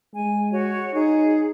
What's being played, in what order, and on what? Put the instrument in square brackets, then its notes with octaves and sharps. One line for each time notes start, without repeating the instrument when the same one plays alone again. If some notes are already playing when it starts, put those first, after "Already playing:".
[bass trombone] G#3 [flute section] G#5
[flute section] F#4 C#5
[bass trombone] D#4 [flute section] G#4